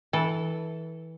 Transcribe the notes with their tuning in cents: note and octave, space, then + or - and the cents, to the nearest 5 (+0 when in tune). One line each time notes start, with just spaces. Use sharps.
E3 -20 A4 +0